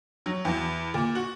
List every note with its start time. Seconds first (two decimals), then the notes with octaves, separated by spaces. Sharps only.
0.26 F#3
0.45 E2
0.94 A#2
1.15 F#4